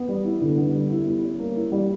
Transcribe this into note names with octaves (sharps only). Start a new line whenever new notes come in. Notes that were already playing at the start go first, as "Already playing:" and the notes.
Already playing: B3
G3
E4
D3
B3
G3
E4
G3
C#4
A#3
E4
G3